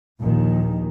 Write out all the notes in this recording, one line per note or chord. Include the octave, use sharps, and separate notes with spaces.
A#1 D#2 A#2 D#3 F3